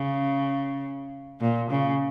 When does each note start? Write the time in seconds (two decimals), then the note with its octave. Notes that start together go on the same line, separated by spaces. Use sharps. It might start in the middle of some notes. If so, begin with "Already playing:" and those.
Already playing: C#3
1.41 A#2
1.71 C#3